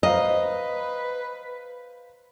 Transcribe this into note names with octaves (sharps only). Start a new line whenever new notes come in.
B4 C5 D#5 F5 A#5